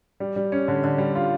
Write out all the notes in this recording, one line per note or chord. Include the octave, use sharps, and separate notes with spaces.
G3
G3
C#4
D3
D3
G3
F4